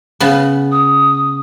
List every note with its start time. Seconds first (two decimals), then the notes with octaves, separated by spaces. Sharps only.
0.20 C#3 B3
0.72 D#6